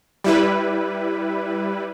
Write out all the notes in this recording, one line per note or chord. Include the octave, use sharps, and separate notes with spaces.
G3 E4 B4